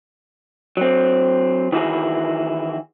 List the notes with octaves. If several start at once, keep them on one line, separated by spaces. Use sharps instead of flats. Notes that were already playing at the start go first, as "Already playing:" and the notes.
F#3 C4
D#3 E3 E4 F#4 G#4